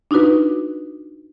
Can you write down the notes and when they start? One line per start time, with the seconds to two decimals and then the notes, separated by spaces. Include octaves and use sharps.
0.11 D4 D#4 F4 F#4 B4